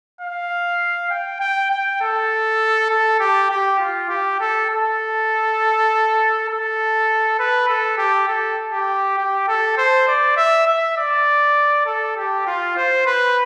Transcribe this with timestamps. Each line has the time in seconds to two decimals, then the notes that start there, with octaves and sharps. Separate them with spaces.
0.21 F5
1.10 G5
1.40 G5
1.71 G5
2.01 A4
2.90 A4
3.20 G4
3.50 G4
3.79 F4
4.09 G4
4.40 A4
4.70 A4
6.48 A4
7.39 B4
7.68 A4
7.98 G4
8.28 A4
8.73 G4
9.18 G4
9.48 A4
9.77 C5
10.08 D5
10.37 E5
10.67 E5
10.97 D5
11.86 A4
12.17 G4
12.47 F4
12.77 C5
13.06 B4